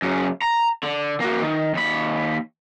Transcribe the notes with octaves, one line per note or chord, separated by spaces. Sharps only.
F#2 C#3
A#5
D3
A#3 F#4
D#3
D#2 B5